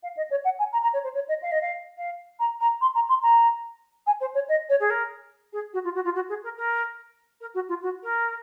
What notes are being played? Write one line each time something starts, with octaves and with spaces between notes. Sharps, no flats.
F5
D#5
C#5
F#5
G#5
A#5
A#5
C#5
C5
C#5
D#5
F5
D#5
F5
F5
A#5
A#5
C6
A#5
C6
A#5
G#5
C5
C#5
D#5
C#5
G#4
A#4
G#4
F#4
F4
F#4
F4
F#4
G#4
A#4
A#4
A#4
F#4
F4
F#4
A#4